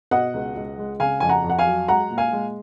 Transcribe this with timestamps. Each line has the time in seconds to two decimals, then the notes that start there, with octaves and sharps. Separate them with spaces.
0.11 B2 D#5 F#5
0.34 C#2
0.55 C#2
0.78 G#3
1.00 C#3 F5 G#5
1.20 F2 G#5
1.29 F#5 A#5
1.44 F2
1.50 F#5
1.59 F5 G#5
1.66 F#3
1.88 G#3 F#5 A#5
2.11 A#2
2.18 F5 G#5
2.33 G#3